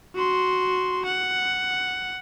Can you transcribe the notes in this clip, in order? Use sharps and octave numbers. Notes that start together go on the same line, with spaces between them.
F#4 C6
F#5